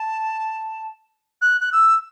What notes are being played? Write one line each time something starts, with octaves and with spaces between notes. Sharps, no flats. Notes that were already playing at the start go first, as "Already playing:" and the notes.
Already playing: A5
F#6
F#6
E6